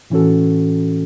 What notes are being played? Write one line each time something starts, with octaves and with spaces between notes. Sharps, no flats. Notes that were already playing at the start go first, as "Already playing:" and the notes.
A2 E3 C#4 F#4 A4